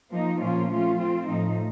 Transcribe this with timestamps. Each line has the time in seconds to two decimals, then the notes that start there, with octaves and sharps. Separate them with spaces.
0.12 F3 A#3 D#4
0.41 A#2 F3 A#3 C#4 F4
0.71 F3 A3 C#4 F4
1.00 F3 C4 F4
1.29 A2 F3 A3 D#4